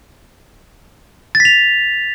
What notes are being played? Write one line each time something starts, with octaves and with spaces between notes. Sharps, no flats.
A6
B6
F7